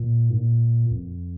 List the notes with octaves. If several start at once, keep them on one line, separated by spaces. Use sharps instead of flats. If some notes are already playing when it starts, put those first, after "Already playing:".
Already playing: A#2
G#2
A#2
F2